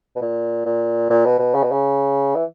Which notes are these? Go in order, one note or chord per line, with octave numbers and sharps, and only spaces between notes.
B2
A#2
A#2
A#2
B2
B2
C#3
B2
C#3
E3